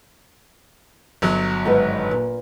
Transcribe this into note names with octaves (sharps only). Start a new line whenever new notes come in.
G1 F#3
G#2 D#3 B4
A#2